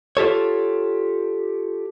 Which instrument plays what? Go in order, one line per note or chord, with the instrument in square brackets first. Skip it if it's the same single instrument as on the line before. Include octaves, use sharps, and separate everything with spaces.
[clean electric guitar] F4 G4 A4 C#5